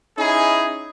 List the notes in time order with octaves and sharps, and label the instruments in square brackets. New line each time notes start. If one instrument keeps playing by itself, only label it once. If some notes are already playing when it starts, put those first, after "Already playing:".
[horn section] C#4 D#4 E4 G#4